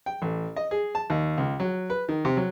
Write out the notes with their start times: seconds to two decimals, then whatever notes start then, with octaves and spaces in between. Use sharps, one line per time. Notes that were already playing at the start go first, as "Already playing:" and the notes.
0.06 G5
0.22 A1
0.56 D#5
0.71 G#4
0.95 A5
1.10 D#2
1.38 C#2
1.60 F#3
1.90 B4
2.09 D#3
2.25 C3
2.37 F#3